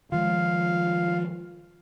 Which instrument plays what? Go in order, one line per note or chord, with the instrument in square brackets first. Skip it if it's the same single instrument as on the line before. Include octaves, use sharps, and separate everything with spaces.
[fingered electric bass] D#3 F3 G#3 [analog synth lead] F4 [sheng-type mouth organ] F5